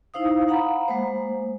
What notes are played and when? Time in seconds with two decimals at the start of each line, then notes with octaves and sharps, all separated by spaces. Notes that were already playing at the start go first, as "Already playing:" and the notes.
0.14 D#4 E4 C5 F5 D#6
0.48 F5 F#5 A#5 B5
0.88 G#3 A#3 C5